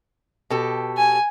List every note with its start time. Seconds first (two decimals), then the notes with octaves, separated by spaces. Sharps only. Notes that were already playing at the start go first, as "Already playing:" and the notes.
0.50 B2 G4 A4
0.97 G#5